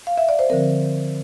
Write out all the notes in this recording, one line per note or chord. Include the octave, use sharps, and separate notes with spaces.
F5
E5
D5
C5
D3 F3 C4 A#4